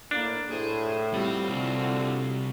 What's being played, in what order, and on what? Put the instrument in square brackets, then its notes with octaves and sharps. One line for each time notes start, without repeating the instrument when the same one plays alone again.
[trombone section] A2 A#3 [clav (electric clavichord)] D4
[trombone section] A2 [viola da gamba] G#4 C5
[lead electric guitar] G3 [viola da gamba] C4 F4 F#4
[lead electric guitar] C2 [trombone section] A2 D3